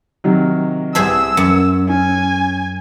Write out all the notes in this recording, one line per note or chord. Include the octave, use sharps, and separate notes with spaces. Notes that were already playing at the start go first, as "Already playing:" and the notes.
C3 D#3 F#3
C2 G3 G#4 C5 E5 A5 E6
F#2 C#7
C#4 G#5